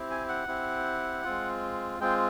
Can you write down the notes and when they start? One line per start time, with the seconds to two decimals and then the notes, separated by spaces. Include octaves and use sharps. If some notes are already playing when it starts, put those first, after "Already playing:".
Already playing: C4 E4 G4
0.10 G#5
0.29 F#5
0.48 C4 E4 G4
1.24 G#3 C4 F4
2.00 G#3 C4 F4 G5